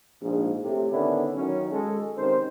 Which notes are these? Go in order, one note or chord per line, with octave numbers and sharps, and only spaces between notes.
A#1 G#2
A2 C3
D3 D#3 B3 C#4 D4 E4
D#3 F#3 C#4
G#3 A4
C3 D#3 C#4 C5